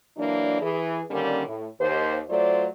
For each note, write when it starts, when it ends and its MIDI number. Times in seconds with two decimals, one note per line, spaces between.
0.17 0.61 52
0.17 0.61 54
0.17 0.61 58
0.17 0.61 62
0.62 1.01 52
0.62 1.01 68
1.10 1.43 50
1.10 1.43 51
1.10 1.43 55
1.10 1.43 58
1.10 1.43 61
1.47 1.67 45
1.80 2.19 39
1.80 2.19 72
2.30 2.67 54
2.30 2.67 57
2.30 2.67 65
2.30 2.67 72
2.30 2.67 74